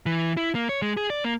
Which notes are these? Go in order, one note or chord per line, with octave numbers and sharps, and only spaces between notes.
E3
E4
A#3
C#5
G#3
G#4
D5
A#3